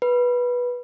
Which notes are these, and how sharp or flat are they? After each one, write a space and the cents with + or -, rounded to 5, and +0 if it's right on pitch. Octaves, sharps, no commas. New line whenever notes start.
B4 -15